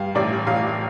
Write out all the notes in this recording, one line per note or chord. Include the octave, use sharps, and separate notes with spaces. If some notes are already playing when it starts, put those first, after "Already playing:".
Already playing: G2 F5
A1 D5
A1 F5